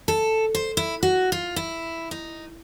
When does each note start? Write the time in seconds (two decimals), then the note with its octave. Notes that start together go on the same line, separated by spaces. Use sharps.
0.08 A4
0.55 C5
0.77 E4
1.03 F#4
1.32 F4
1.56 E4
2.11 D#4